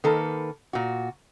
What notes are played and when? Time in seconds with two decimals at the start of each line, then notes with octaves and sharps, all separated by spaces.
0.04 D#3 A#3 A4 B4
0.73 A#2 F#4